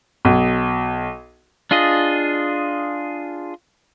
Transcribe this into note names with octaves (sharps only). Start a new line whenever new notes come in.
B1
D4 F4 G#4 D#5